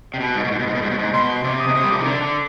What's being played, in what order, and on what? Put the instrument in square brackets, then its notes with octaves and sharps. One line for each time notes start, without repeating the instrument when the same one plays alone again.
[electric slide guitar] C3
B2
G#2
B2
G#2
B2
G#2
B2
G#2
B2
G#2
[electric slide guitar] B2 [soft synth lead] C6
[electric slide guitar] C3 [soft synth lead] D6
[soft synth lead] D#6
[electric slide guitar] B2
[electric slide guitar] C3 [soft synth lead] D#6
[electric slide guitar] G3
[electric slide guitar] F3 [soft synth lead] D6
[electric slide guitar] D#3
[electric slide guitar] D3 [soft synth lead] D6
[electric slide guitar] D3